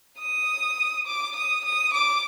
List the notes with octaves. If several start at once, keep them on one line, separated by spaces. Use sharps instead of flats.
D#6
D6
D#6
D#6
D6